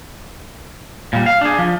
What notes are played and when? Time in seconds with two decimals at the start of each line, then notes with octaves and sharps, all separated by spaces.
1.13 A#2 G3
1.26 F5
1.41 D4 G#4
1.58 F3